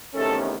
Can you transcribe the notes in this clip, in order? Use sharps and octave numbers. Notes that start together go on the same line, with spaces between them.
E2 C3 D#3 A3 C#4 A4